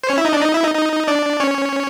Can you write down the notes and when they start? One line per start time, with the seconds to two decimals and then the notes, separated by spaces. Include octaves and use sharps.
0.03 C5
0.09 C#4 C#5
0.18 E4 E5
0.25 D#4 D#5
0.33 D4 D5
0.41 D#4 D#5
0.53 E4 E5
0.64 D#4 D#5
0.75 D#4 D#5
1.08 D4 D5
1.40 C#4 C#5